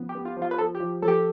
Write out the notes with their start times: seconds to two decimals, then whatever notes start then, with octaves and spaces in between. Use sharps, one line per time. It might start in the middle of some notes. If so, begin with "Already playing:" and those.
Already playing: F3 B3
0.09 G4
0.15 B3
0.25 F4
0.37 F3
0.42 F4
0.51 B4
0.58 F3 A4
0.75 G4
0.80 F3
1.02 F3 A4
1.08 G4